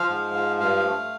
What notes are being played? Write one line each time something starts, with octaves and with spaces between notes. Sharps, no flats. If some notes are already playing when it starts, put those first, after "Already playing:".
Already playing: F3 F5
G#2
F3
G2 F5
A3